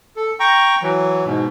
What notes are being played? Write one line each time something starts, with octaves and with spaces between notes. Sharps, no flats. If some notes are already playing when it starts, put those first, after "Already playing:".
A4
G5 A#5 C#6
E3 F#3
G#2 B2